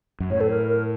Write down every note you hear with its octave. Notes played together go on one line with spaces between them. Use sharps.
F#2
A2 C#5
A4
A#4
A#4